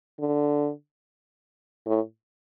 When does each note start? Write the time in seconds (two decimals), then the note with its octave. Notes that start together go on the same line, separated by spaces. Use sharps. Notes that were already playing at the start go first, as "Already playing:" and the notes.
0.20 D3
1.86 A2